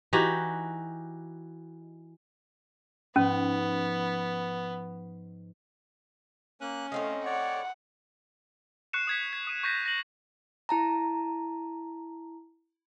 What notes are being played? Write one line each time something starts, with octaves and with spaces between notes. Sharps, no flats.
E3 D#4 F#4 G4
G#2 F3 B3 C#4
A#3 C#4 F#6
A2 A3 C4 D#4 F5
C#5 D5 F#5
C#6 F#6 C7 C#7 E7
D#6 G#6 B6
G#6
D#6 D#7
C#6 G6 A#6 B6
A#6 F#7
E4 A5 A#5